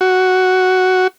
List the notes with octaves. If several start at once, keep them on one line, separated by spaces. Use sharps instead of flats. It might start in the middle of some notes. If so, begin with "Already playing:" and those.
F#4